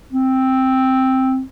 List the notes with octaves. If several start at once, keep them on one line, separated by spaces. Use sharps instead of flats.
C4